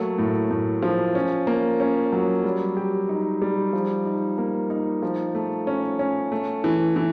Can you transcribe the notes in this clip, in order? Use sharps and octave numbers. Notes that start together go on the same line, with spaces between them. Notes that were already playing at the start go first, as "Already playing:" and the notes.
Already playing: F#3 A3 A#3
A2
A2
F3
C#4
A#3
C#4
F#3
G3
G4
D#4
G3
F3
D#4
A#3
D#4
F3
A3
C#4
C#4
A3
E3
E3